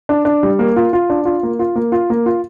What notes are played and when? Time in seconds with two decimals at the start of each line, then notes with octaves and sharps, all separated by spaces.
0.09 D4
0.25 D4
0.43 G3
0.59 A#3
0.76 F4
0.93 F4
1.10 D4
1.25 F4
1.43 A#3
1.59 F4
1.76 A#3
1.92 F4
2.10 A#3
2.26 F4